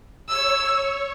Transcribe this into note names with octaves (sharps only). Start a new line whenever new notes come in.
C#5 E6